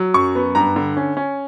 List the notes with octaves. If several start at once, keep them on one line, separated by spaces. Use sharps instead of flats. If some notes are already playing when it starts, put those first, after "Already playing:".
Already playing: F#3
F#2 C#6
B3
G2 A#5
D3
C#4
C#4